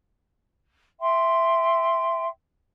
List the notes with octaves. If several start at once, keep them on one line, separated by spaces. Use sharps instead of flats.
E5 G5 C6